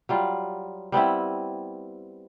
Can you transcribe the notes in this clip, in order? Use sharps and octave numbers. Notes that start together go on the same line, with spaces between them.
F#3 G3 F4
G3 B3 C4 E4